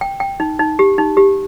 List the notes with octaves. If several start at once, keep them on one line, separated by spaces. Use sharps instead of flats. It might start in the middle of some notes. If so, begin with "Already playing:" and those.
G5
G5
D#4
D#4
G4
D#4
G4